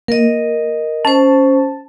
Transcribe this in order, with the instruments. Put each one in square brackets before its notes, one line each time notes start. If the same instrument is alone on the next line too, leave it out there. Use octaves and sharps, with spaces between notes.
[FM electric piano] A#3 [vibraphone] A#4 D#5
[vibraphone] C#4 C5 [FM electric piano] A5